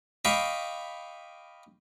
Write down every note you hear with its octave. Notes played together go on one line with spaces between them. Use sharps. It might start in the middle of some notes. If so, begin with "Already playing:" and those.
D#5 F5 G5 B5 C#6 D6